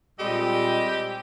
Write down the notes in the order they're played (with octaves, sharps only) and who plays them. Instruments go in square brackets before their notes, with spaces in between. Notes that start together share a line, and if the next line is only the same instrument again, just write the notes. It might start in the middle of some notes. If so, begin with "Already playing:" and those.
[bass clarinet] A#2 [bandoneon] G3 G#3 [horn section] C4 A4 D#5 [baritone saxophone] G4